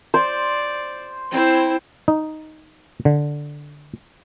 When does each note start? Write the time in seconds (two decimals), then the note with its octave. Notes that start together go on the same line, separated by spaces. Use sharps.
0.14 C5 D5
1.31 C4 E4 C5
2.08 D#4
3.05 D3